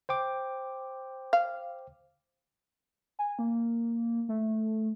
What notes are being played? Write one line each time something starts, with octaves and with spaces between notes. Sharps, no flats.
C5 G5 D6
F5
G#5
A#3
A3